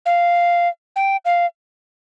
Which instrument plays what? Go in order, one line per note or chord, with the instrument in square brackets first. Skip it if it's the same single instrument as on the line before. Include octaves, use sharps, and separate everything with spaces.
[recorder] F5
G5
F5